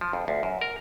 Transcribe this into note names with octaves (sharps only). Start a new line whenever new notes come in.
F3
F2
D2
F#2
A#4